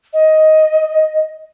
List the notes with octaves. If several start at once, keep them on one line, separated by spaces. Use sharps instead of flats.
D#5